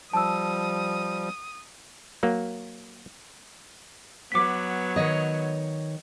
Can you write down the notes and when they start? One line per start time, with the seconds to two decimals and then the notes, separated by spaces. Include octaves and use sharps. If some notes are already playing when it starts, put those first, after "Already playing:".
0.13 F3 G3 A5 D#6 E6
2.23 F#3 A#3
4.32 F#3 B3 D6 B6
4.96 D#3 C#5 D#5